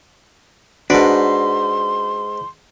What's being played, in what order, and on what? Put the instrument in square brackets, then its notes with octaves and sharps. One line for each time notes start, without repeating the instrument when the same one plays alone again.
[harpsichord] G#2 B4 [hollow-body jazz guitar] D4 F#4 D5 [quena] C6